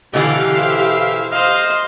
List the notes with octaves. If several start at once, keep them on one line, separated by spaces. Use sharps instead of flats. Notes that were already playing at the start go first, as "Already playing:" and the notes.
B2 D3 E3 G4 F5
E4 C5 E5
C5 D#5 F5